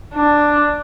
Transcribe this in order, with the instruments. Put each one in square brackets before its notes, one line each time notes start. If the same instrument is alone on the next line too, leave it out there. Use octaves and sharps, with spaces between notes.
[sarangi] D4